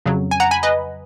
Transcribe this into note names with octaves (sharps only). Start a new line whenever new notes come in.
F2 C#3 F#3
G#5
F#5 A#5
G#5 B5
B4 D#5